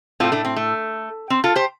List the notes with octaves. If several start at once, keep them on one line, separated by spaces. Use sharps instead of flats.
A2 A3 C4 F4
A3 D4
C4
A3
C4
F4 A4
G4 C5